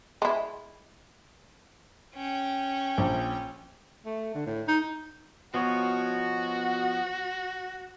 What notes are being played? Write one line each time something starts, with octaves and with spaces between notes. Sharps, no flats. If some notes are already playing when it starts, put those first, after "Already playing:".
G#3 E4
C#4 G5
A#1
A3
D3
A2
D#4
B2 F3 B3 F#4 C#5 F#5